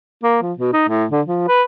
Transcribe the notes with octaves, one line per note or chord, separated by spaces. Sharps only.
A#3
F3
B2
D#4
A2
D3
F3
B4